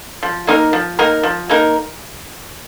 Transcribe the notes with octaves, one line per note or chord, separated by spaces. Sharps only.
F3
A#3 D#4 A#4
F3
A#3 D#4 A#4
F3
A#3 D#4 A#4